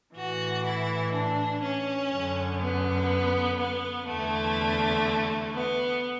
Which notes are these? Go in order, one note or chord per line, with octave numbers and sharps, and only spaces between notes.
A2 E3 F#4
E4
D4
C#4
F#2 D3
B3
B3
E2 D3 A3
B3